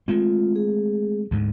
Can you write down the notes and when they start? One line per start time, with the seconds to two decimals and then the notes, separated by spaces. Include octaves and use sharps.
0.08 G#3 A3 C4 F4
0.56 G#4
1.31 D2 G#2